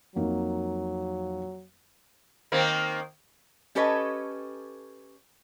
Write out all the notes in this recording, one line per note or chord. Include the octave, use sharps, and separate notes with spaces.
F2 F#3 A#3 D#4
D#3 A#3 C4
C#4 G4 A4 B4 C#5 D#5